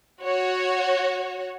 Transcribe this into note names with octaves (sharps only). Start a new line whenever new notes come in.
F#4 C#5